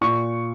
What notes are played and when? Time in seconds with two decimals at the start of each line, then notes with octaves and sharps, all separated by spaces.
0.01 A#2 C#6